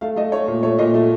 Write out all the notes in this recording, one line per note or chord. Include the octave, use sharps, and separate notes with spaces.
A3 F5
A3 D#5
A3 C#5
A#2
A3 C#5
A#2 D#5
A3